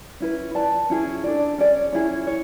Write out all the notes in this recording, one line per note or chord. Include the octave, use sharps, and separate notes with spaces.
C#4 E4 B4
B4 D5 A5
C#4 E4 G#4
D4 A4 D5
C#4 G#4 D5
C#4 E4 G#4
C#5